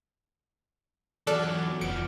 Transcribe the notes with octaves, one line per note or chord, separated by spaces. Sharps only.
E2 F#3 A4 D5 D6 F6 F#6
F1 F3 B3 C#7 D7